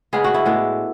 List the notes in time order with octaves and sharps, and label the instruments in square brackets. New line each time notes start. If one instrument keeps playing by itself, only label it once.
[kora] C#3 G#3 B3 G#4
F#4
E4
A2 G#3 B3 D4